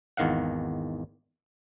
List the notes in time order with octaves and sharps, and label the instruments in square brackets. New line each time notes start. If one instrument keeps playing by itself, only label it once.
[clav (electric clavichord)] G#1 E2 D#3 F5 F#5